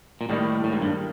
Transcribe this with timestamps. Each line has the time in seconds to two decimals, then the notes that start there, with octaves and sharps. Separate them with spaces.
0.21 A#2
0.29 A2 D#3 G3 A#3 D#4
0.64 A2
0.73 G#2
0.82 G2